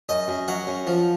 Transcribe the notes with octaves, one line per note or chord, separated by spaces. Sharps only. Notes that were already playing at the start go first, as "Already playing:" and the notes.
F#2 D#5
F#2
F#3 F#5
F#2
F3